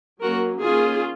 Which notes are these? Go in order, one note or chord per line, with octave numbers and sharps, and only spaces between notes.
F#3 A#3 C#4 F#4 A#4
D#3 A#3 C#4 F4 G#4